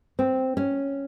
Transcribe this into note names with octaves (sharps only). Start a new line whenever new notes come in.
C4
C#4